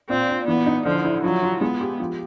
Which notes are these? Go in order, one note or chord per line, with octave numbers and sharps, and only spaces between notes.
A#2 C4
D4
E3 B3
D#4
D3 F3
E4
F3 F#3
F4
G#3 B3
G4
F3